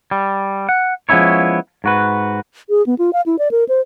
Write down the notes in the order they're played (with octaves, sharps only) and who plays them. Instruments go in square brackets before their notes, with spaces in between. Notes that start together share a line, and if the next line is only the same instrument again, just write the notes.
[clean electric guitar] G3
F#5
F3 G#3 B3 C#4 E4 C#5
G#2 F#4 B4
[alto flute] G#4
B3
F4
F5
E4
D5
A#4
C5